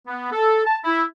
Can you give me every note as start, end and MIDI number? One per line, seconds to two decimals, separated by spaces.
0.07 0.29 59
0.32 0.62 69
0.65 0.78 81
0.85 1.02 64